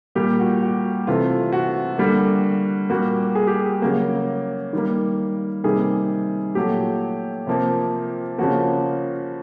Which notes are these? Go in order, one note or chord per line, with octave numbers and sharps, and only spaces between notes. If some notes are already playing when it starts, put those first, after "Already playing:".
A#2 G3 A#3 G4
F#4
F#4
C3 E3 A3 F4
F#4
D3 G3 A#3
A#2 G3 A#3 F#4
G#4
G4
G#4
C#3 F#3 A#3
D#3 G3 A#3
C3 D#3 G3 A#3 G#4
A#2 F#3 A3 G4
C3 F3 A#3
C#3 F3 A#3 F#4